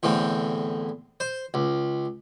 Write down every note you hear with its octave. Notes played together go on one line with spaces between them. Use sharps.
E2 A2 D3 C4
C5
C#2